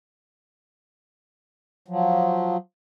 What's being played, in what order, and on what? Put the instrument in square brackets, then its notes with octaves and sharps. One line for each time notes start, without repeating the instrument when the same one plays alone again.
[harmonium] F3 F#3